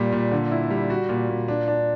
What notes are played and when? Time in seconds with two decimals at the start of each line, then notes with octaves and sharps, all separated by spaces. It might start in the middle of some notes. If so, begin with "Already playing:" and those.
Already playing: A#2 G3
0.12 A#2
0.32 D3
0.51 E4
0.70 G3
0.90 F#4
1.09 A#2
1.29 A#2
1.48 D4
1.68 D4